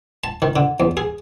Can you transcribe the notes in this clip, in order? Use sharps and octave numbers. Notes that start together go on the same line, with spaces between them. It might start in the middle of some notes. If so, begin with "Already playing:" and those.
A5
D#3
D3
E2
G#4